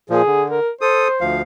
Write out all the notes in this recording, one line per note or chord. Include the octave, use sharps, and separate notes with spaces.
A#2 F3 G#4
D3
A#4
A4 C5 D#6
D2 F3 F5